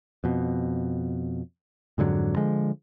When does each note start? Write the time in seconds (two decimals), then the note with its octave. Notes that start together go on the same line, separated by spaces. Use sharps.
0.24 F2 B2
1.98 F2 G#2 D3 F#3
2.36 D3 F3 G#3